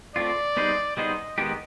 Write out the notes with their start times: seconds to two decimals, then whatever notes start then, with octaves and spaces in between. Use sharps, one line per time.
0.16 A3 C4 F4 D5
0.57 G3 B3 D#4 G#4 C5
0.97 G3 B3 D#4 G#4 C5 D#5
1.38 D#3 G#3 B3 D#4 G4